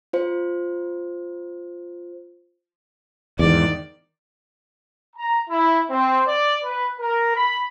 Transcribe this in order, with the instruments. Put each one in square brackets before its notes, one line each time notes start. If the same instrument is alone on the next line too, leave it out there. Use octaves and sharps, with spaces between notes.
[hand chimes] F4 C5
[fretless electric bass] E2 G#2 [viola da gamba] D#3 D5
[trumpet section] A#5
E4
C4
D5
B4
A#4
B5